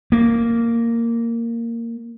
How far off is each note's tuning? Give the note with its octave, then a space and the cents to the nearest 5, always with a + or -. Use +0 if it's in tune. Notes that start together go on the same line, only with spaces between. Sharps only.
A#3 -10